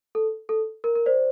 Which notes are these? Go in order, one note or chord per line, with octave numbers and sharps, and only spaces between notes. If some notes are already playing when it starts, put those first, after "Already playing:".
A4
A4
A#4
A#4
C5 D5